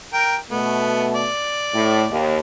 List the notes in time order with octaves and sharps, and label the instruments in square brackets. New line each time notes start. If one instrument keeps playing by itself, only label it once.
[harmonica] A#4 G5
[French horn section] B2 A3 [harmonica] B3
[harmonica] D5
[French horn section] A2
D#2